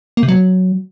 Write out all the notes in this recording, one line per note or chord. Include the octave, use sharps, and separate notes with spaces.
A#3
C3
F#3